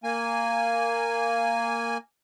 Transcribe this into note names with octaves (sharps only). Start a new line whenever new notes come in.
A#3 G#5